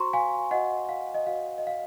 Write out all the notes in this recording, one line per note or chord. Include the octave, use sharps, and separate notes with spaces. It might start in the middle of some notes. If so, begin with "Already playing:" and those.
Already playing: F#4 C5 A#5 C6 C#6
F5 G#5
F#4 C5 D#5 F#5
F5
D#5
F#4 C5 F5
D#5
F5